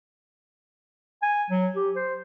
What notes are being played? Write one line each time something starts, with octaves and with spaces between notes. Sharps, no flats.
G#5
F#3
G4
C5